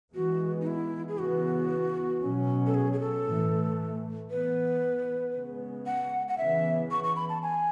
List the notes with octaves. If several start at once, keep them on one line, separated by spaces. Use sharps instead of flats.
E3 G#3 B3 F#4
D#4
E4
G#4
C#3 E3 B3 F#4
B2 F#3 C#4
A4
G#4
G#4
A4
A2 E3 A3
E3 B3 B4
C#3 G#3 B3
F#5
F#5
C#3 E3 B3 E5
C#6
C#6
B5
A5
G#5